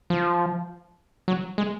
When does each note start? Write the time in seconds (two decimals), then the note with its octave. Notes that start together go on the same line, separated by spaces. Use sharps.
0.10 F3
1.28 F#3
1.58 G#3